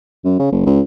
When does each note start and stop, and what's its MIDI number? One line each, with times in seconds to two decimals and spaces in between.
0.24 0.38 42
0.39 0.48 49
0.52 0.63 30
0.66 0.81 37